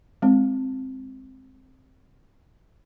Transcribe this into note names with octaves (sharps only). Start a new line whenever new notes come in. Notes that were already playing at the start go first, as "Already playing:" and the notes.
G#3 C4